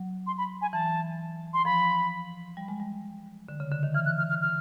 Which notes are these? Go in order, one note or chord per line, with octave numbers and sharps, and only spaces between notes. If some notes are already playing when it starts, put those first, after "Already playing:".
Already playing: F#3
C6
B5
G#5
E3 A5
C6
F3 B5
G3
G#3
G3
D3
C#3
D3
D#3
E3 F6
F#6
F6
F6
F6